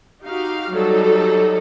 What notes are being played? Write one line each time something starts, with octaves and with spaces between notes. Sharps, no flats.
D#4 F#4 G4 F5
F#3 G3 D#4 A4